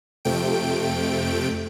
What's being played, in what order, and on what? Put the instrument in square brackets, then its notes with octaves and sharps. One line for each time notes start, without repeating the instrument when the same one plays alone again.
[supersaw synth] F2 C3 A3 G5 D7